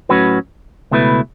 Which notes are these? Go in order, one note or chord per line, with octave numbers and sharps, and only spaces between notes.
A2 F#3 C#4 F#4 B4
C#2 B2 A3 E4 B4